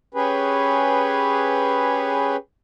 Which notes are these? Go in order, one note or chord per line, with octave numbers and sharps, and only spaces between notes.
C#4 G4 G#4 B4